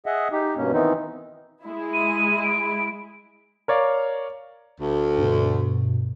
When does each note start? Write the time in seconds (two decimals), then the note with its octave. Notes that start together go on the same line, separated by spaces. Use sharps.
0.06 G#4 D#5 E5 F#5
0.32 D#4 G4
0.56 G2 B2 A#3 C#4
0.73 D#3 E3 B3 C4 D#4
1.64 G#3 E4
1.93 D#7
2.43 D7
3.68 A#4 C#5 D5 F5
4.81 D2
5.18 G2 B2